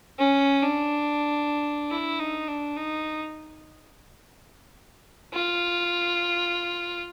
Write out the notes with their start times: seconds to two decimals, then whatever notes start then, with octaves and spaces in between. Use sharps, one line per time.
0.19 C#4
0.63 D4
1.90 E4
2.20 D#4
2.48 D4
2.77 D#4
5.33 F4